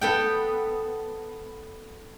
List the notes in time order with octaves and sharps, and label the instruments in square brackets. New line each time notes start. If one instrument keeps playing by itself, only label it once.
[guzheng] B3 A4 G5